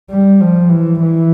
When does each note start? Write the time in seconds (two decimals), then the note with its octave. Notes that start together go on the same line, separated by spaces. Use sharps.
0.11 G3
0.41 F3
0.70 E3
1.00 E3